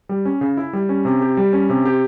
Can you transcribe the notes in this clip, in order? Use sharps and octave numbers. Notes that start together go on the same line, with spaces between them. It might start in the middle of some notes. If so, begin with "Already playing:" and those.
G3
C#4
C#3
E4
G3
C#4
C3
G4
G3
C#4
C3
G4